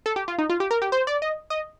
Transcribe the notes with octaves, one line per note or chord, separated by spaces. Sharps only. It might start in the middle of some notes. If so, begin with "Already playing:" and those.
A4
G4
F4
D#4
F4
G4
A#4
G4
C5
D5
D#5
D#5